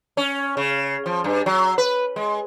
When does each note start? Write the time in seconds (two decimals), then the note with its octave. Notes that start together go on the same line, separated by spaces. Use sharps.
0.17 C#4
0.57 C#3
1.06 F3
1.24 G2
1.46 F#3
1.78 B4
2.16 G#3